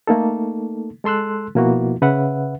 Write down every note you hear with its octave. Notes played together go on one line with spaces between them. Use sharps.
A3 A#3 D#4 A4
G#3 A4 C6 E6 F#6
B2 F3 A#3 E4 F#4
C#3 B4 E5 F#5